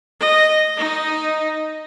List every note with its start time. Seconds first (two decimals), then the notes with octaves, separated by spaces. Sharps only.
0.20 D#5
0.78 D#4